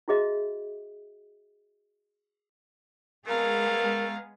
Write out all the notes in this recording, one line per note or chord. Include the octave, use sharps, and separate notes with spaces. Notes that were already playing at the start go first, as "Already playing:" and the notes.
E4 F#4 G#4 D#5 E5
G#3 A3 B3 G#4 A#4 F5 A#5